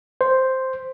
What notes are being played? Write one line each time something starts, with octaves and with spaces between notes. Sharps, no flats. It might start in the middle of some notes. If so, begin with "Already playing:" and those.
C5